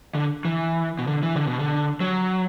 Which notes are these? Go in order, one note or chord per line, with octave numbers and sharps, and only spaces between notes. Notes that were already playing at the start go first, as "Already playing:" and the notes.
D3
E3
B2
D3
E3
D3
B2
D3
F#3